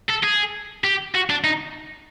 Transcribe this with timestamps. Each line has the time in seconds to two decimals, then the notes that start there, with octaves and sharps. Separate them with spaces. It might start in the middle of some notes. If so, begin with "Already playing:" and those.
0.09 A4
0.23 G#4
0.84 G4
1.15 F#4
1.30 D4
1.44 D#4